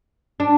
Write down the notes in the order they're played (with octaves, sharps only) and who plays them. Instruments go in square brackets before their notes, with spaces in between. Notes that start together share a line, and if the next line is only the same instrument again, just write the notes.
[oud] D4